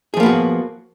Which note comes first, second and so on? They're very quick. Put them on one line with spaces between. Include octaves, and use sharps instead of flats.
G#4 F3 A#3 B3 F#4